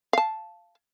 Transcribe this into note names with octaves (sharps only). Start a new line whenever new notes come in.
F5 A5